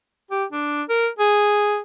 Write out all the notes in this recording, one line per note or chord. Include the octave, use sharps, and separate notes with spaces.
G4
D4
A#4
G#4